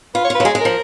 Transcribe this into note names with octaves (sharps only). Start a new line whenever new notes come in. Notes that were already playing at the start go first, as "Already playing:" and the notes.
F4 B4
C#5
F4 B4
F#3
G#3 G#4
G#3
F3 A#4